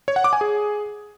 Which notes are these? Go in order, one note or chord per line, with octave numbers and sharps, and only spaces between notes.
C#5
F#5
D6
G#5
G#4